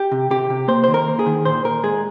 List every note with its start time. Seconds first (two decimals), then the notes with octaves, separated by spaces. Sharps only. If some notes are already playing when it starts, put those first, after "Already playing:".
Already playing: G4
0.12 C3
0.31 C3 G4
0.50 C3
0.68 A#3 C5
0.84 D#3 C5
0.94 A#4
1.08 A#3
1.19 G#4
1.26 D#3
1.45 A#2 C5
1.64 A#2 A#4
1.83 G#3 G#4